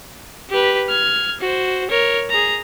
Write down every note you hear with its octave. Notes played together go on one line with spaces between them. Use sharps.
G4 B4
F6 G#6
F#4 C5
A#4 C#5
G#4 A#5